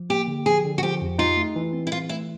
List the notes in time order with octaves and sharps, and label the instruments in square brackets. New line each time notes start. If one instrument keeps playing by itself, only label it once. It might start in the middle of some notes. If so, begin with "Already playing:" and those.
Already playing: [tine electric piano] F3
[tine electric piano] A#3 [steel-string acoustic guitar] G4
[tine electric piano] D3
[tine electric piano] F3 [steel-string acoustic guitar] G#4
[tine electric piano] D3
[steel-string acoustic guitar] F#4
[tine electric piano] F3 [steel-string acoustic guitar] G4
[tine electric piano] F2
[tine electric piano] D#4 [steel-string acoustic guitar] F4
[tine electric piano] A3
E3
C4
[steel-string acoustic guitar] E4
[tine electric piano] E3 [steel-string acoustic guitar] F4
[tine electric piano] A3 [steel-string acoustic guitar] E4